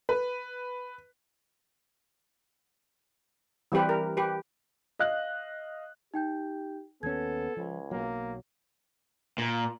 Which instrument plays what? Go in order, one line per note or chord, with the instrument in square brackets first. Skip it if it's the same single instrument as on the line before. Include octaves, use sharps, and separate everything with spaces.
[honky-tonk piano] B4
[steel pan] E3 G3 C4 G4 B4
A#4
G4 B4
[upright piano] D#5 F5 F#6
[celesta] D#4 G5 G6 [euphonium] G4
[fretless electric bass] D#2 C#4 [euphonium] B3 [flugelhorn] A4 [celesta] G#6
[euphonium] C#2 [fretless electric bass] F3
[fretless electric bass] B1 F#3 [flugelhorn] A#3
[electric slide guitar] A#2